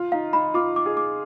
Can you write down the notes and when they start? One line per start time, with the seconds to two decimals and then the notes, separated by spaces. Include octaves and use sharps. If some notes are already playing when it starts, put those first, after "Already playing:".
Already playing: F4
0.12 D#4 F5
0.33 D#4 B5
0.54 F4 D6
0.76 D6
0.86 G#4
0.97 D6